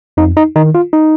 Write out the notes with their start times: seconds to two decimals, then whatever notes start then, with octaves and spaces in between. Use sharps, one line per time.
0.17 F2 D#4
0.37 D#4
0.56 D#3 D#4
0.75 F4
0.93 D#4